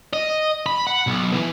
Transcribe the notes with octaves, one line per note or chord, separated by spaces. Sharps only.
D#5
B5
F#5
B1
E3